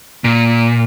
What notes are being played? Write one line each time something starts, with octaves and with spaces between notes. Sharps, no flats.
A#2